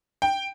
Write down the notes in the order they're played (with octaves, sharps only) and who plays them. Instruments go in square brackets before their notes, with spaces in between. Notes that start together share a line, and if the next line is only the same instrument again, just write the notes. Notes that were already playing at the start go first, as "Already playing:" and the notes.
[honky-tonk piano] G5